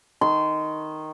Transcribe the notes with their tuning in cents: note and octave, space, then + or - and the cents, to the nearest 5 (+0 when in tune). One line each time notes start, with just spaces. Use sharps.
D#3 +0 C6 -20